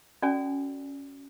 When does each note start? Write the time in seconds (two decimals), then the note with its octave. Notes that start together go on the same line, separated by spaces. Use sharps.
0.22 C#4 F#4 A4 D5 G#5